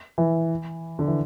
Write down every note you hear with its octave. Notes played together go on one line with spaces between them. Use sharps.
E3
D3
E3